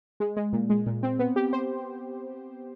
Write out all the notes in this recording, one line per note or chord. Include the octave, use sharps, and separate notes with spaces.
G#3
G#3
A#2
G#3
A#2
C4
B3
G4
C5